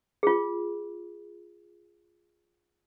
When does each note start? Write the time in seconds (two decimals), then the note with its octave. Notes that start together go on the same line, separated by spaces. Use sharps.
0.23 F4 G#4